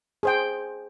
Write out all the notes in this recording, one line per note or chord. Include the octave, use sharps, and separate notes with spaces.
G#4 C5 G5